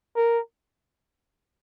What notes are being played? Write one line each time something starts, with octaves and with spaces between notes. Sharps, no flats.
A#4